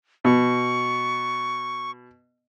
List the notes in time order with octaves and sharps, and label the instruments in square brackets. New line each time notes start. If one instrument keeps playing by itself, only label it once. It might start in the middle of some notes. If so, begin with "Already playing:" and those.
[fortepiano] B2 [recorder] C#6